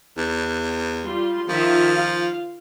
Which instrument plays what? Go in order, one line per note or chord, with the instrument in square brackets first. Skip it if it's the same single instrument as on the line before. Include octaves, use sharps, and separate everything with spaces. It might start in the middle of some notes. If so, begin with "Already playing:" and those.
[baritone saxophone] E2
[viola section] G3 F4 C6
[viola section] D#3 F4 E5 [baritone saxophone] F3
[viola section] F4 F5